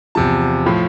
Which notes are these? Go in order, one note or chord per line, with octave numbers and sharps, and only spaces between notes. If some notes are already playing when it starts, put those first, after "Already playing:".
E2 C3 F3 A5
A2 F3